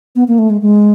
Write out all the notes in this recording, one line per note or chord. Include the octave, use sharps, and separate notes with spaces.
B3
A#3
A3
G#3
G#3